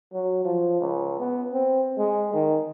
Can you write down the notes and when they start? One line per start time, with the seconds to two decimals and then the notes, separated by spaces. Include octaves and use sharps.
0.13 F#3
0.45 F3
0.80 C#2
1.19 B3
1.53 C4
1.98 G#3
2.33 D#3